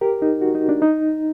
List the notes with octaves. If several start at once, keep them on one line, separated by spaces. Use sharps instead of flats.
G4 A#4
D#4
F#4
D#4
D4
D#4